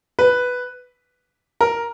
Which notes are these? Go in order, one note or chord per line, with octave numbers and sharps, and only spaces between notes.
B4
A#4